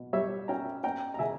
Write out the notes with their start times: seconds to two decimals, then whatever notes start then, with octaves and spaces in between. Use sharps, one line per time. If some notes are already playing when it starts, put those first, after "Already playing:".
Already playing: B2
0.13 G3 C#5 E5
0.48 C#4 G5 A#5
0.83 C#4 G5 A#5
1.14 A#5
1.19 C#3 E5 G#5